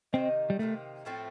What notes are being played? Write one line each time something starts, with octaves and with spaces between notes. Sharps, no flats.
C3 D#3 A#3 C4 D#4
G3
C3 D#3 A3 A#3 D#4
A2 F3 A3 C4